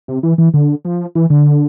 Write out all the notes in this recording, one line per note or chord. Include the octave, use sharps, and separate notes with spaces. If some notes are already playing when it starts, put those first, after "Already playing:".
C3
E3
E3
D3
F3
E3
D3